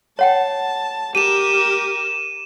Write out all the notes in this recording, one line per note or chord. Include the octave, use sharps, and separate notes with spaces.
C#5 F#5 G5 A5
G4 A#4 D#7 E7